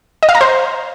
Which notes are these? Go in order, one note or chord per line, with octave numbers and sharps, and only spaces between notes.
D#5
F5
A#5
C5